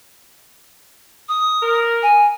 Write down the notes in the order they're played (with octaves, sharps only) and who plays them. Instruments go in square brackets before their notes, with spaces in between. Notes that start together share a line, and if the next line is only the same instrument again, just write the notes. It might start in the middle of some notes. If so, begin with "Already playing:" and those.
[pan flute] D#6
[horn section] A#4
[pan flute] G#5